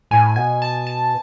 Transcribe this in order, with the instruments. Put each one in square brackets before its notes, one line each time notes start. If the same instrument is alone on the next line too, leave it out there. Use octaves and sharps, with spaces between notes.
[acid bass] A2 [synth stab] G#5
[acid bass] B2 [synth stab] G#5
[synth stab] A5
A5